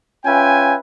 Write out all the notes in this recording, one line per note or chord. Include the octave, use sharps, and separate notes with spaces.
C#4 F4 B4 E5 G5 G#5